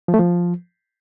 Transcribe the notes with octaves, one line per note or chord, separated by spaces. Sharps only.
F3
A3
F3